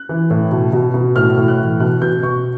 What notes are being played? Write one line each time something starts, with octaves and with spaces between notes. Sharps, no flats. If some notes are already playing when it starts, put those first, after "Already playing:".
Already playing: F#6
E3
A2
B2
B2
B2
A2 F6
A2
F#6
E3
B2 F#6
B2 G6
B2 C#6